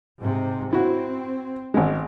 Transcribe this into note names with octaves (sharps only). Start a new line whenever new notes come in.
G#2 C3
C4 E4 F#4
G#1 G#3